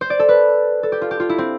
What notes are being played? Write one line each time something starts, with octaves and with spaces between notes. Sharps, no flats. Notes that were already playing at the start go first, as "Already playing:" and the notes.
C5
D5
A4
B4
A4
G4
F4
G4
F4
E4
C4